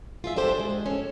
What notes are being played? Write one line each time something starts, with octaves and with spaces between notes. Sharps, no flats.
F4 G#4 E5
D4 G4 A4 C5
G#3
C#4 A4